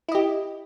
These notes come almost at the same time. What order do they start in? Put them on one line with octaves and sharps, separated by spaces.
E4 D#5 G4